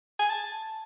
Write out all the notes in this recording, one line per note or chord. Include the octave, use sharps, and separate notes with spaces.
G#5
A5